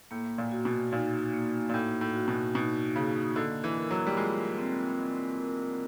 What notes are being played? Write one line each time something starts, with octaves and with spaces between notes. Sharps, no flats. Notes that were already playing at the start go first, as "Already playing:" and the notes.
A2 A#3
A#2
F#4
B2
A#2 D#4
A#3
A#2
A2 A#3
A2
F#4
B2
B2 D#4
C#3 A#3
D3 D#5
E3
A#4
F#3
G3
G#3 F4
C4
D#5
A#4